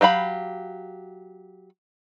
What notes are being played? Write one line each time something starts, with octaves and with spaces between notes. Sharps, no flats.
F#3 G4 F5 B5